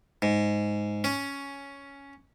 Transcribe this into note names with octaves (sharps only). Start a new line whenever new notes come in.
G#2
C#4